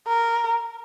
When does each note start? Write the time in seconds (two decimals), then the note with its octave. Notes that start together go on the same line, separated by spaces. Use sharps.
0.08 A#4